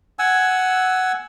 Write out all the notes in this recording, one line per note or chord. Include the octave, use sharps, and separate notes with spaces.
F#5 G#5 E6